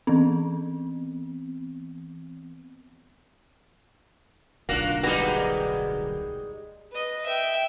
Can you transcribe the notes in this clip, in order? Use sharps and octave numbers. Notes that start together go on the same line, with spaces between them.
E3 B3 C4
D1 B1 A#3 D4 F4 F#4
G3 G#3 A#3 B3 D#4 F#4
B4 D#5
E5 G5